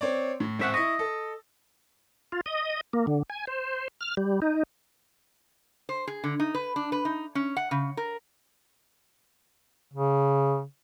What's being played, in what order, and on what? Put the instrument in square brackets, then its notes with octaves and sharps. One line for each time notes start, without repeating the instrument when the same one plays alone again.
[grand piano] C4 C#5 D5
A2
[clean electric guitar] G#2 E5 F#5 [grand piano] C4 C#6
[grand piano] E4 C#6 [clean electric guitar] D#5
[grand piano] A4
[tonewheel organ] F4
D#5
A#3
D3
G#5
C5
F6
G3
D#4
[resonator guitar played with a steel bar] C5
G#4
D3
D#4
B4
D4
B4
D#4
C#4
F#5
C#3
A#4
[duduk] C#3